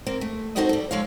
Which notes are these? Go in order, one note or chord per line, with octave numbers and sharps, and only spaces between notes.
A#3 C4
A3
B3 C4 D#4 F#4 A4 C5
G3 A4
F3 G#3 A4 C#5 F5